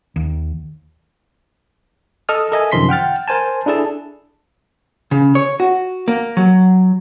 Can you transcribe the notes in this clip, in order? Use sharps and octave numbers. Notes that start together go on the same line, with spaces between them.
D#2
A4 D#5 A5 D#6 F6
A4 A#4 D#5 E5 G#5
F#2 C3 D#3 F3 C6 B6
F#5 G5 F6 A6
A#4 C5 G#5 A5
D4 E4 G#4 A4 A5
C#3
C#5
F#4
A#3
F#3